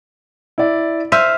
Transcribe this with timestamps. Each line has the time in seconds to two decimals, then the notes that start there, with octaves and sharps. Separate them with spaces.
0.58 E4 D5
1.12 C5 E5 F5 D#7